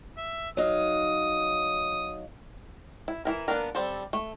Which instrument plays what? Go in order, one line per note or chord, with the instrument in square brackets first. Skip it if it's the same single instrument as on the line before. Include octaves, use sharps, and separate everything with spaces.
[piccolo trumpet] E5
[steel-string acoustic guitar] F#3 D#4 F5 [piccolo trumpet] D#6
[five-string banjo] E4
E3 E4 A#4
A#3 B3 D4 A#4
G3 C4 A4
A3